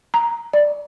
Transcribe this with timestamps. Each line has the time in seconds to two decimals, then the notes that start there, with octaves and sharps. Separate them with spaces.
0.14 A#5
0.53 D5